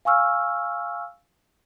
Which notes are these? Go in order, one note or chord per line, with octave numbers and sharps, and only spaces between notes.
F5 G#5 C#6 E6 F6